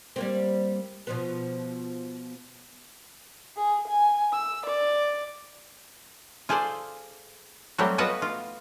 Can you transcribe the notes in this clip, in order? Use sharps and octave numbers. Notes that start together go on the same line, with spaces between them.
G3 A#3 C4
B2 F3 B3
G#4
G#5
E6
D5
F4 G#4 A4 C5 D5
F#3 G3 A3 C4 G4
B3 F4 F#4 B4 D#5 F#5
F4